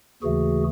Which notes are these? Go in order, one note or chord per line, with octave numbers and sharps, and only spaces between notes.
D#2 C#3 E3 A3 F#4 G#4